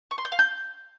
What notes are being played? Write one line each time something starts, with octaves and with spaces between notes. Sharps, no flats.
C#6
C6
G6
F5
G6